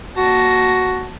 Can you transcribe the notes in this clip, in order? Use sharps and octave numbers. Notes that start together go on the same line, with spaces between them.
A#3 F#4 A5 A#6